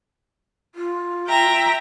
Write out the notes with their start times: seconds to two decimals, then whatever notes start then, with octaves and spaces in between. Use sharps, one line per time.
0.75 F4
1.28 E5 G5 A#5